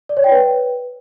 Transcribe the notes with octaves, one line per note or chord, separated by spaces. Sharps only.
D5
C#5
G5
B4